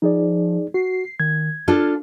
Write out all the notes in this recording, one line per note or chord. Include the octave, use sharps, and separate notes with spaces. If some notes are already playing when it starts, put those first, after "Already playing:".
F3 D#4 G#4 D5
F#4 C7
D#3 G#6
D4 F4 A4 F6